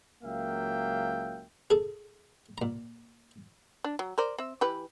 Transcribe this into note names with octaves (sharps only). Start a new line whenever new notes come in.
C#2 F#3 A#3 E5 F5 G5
G#4 A4
A#2 A#5
D4
F#3
A#4 C5 D5
C4 E5
E3 G4 B4